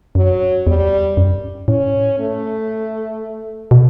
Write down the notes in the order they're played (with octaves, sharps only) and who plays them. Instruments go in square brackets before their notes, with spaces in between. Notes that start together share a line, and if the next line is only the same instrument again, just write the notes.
[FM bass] F#2 [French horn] F#3
[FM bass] E2 [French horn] G3
[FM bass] F#2
[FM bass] A2 [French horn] C#4
[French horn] A3
[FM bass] B2